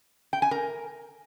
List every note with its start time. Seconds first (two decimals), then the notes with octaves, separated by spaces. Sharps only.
0.33 G5
0.42 G#5
0.51 A#4